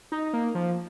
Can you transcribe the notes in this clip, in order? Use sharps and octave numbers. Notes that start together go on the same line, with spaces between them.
D#4
A#3
F3